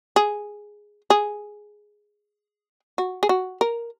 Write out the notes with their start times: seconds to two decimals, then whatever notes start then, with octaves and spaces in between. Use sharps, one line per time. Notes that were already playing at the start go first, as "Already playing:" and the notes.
0.16 G#4
1.10 G#4
2.98 F#4
3.23 G#4
3.29 F#4
3.61 A#4